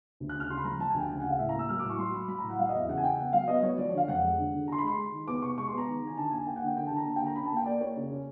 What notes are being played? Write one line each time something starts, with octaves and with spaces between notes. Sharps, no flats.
D2
F#6
C#3
F6
C#3 C6
B5
F3 A#5
F3 A5
G#5
D2
G5
C#3 G#5
C#3 F#5
F5
A2 E5
A#5
A#3 E6
F#3 F6
D6
A2
C#6
F#3 C6
F#3 B5
F#3 B5
A#5
A2
F#5
F#3 F5
D#5
E2
E5
C#3 F#5
G#5
C#3 G5
B3 F#5
F#3 F5
B3 D#5
F#3 C#5
F3 D5
C#5
D3 F5
F2 F#5
G#3
D3
D3
D3 A#5 C6
B5
G#3 C6
G#3
D#3
B3 D6
C3 C#6
G#3 C#6
C6
B3
A#5
D#3
D#3 G#5
D3 A5
A#3 G#5
A#3 G5
F#5
D3 G5
D3 G5
A5
D3
A#5
A#3 A5
G5
D3
A#5
C#4 B5
A5
A#3 G5
A#3 D5
A#3 C#5
C#3
C#4